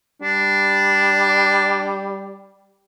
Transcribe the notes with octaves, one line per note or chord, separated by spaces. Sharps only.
G3 D4